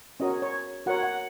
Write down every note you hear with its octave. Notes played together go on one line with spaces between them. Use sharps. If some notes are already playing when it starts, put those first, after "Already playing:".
C#4 F#4 A#4 C#5 D#5
C#5
F#4 A#4 C#5 F#5
F#5